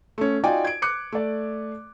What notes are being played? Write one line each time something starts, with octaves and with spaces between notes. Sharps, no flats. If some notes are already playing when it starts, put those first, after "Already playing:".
A3 C#4
D#4 F4 F#4 D5 G5 G#5
G#6 D7
D6 F#6 C#7
A3 D5